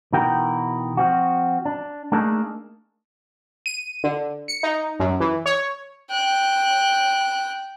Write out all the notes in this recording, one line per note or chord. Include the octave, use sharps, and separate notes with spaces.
B2 E3 D#4 F#4 A#4 G5
F3 C4 F#4
D4
A3 A#3 D4 D#4 G#4 A4
D#7
D3
C#7
D#4
F#2
E3
C#5
G5 F#6